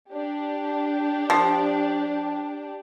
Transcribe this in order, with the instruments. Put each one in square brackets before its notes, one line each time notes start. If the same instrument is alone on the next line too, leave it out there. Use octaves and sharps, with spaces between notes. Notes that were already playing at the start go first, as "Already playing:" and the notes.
[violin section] D4 G4
[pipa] F3